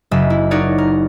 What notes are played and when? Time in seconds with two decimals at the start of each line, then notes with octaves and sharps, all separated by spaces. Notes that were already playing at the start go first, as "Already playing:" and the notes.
0.11 F#1 D#5 E5
0.30 E4
0.51 D#4 F#4 A#4 C#5 D5
0.78 A#4